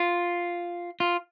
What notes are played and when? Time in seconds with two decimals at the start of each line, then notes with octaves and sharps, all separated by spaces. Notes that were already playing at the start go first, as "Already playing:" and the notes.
Already playing: F4
1.00 F4